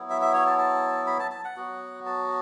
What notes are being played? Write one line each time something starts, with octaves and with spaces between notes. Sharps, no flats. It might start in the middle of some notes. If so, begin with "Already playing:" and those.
Already playing: F#3 B3 E4
E5
E5
C#5
A5
A5
B5
A5
A5
F#5
F#3 B3 F#4
A5